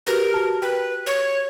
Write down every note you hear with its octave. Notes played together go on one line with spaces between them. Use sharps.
F#4 G4 A#4 B4
A5
B4 G5
C#5